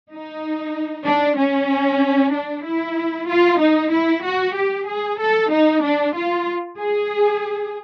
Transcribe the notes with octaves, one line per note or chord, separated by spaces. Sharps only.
D#4
D4
C#4
D4
E4
F4
D#4
E4
F#4
G4
G#4
A4
D#4
D4
F4
G#4